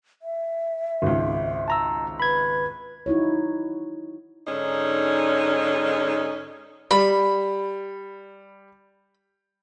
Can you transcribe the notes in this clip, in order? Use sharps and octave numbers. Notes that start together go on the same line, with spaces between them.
E5
G#1 C#2
A5 A#5 E6
B4 B5 G#6
D#4 E4 F#4 C#5
G#2 D3 C#4 D#4
G3 B5